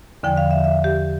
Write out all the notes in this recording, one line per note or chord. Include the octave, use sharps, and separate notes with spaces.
E2 D3 F3 G5
F5
E5
E5
G4